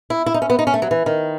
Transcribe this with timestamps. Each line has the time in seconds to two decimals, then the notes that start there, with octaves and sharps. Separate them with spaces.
0.10 E4
0.26 E4
0.34 D#4
0.42 C#4
0.50 B3
0.59 D#4
0.67 C#4
0.74 A3
0.82 F#3
0.91 E3
1.06 D#3